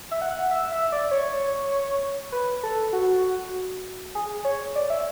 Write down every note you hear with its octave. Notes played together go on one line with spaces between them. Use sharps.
E5
F#5
E5
E5
D5
C#5
B4
A4
F#4
G#4
C#5
D5
E5